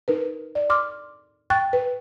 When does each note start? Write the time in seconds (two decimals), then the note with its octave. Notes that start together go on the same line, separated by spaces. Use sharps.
0.08 D#4 A#4 B4
0.55 D5
0.70 C6 D6 F6
1.50 G5 C#6 F#6 A6
1.73 B4